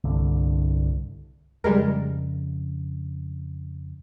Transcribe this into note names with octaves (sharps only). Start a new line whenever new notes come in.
C2 G2 D3
F2 C#3 G3 G#3 A#4